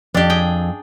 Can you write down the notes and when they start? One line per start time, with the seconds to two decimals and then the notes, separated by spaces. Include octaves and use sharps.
0.14 F2 D4 G4
0.30 G#4 G5